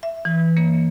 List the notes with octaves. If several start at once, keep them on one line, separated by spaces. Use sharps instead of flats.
E5
E3
A#3